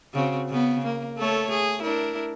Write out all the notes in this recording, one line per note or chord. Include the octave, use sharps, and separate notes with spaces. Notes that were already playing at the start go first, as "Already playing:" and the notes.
C#3 C4 F#4
C#3 B3
A#3
A3 A4 C#5
G#4
D4 E4 A#4